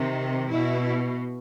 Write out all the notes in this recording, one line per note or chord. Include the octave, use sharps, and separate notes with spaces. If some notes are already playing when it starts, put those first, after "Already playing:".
Already playing: C3 D#3
B2 E4